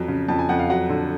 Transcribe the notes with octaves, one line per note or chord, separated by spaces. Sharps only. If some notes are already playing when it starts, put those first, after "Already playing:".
Already playing: F2 F#3
C#3
F2 A5
G#5
F2 F#5
F5
F#3 F#5
D3